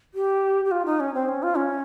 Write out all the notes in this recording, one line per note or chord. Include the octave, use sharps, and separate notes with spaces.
G4
G4
F4
D#4
C#4
C4
C#4
F4
C#4